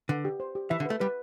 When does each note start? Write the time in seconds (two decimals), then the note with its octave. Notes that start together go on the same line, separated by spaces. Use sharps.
0.09 D3 B4
0.25 G4
0.40 C5
0.55 G4
0.70 E3 E5
0.80 D3
0.86 A3 B4
1.00 G3 B4